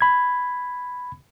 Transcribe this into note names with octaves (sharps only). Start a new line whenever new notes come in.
B5 G#6